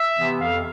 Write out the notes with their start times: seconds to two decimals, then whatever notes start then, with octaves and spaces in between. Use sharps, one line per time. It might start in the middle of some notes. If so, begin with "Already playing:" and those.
Already playing: E5
0.17 C3 E3 B3
0.41 F2 F5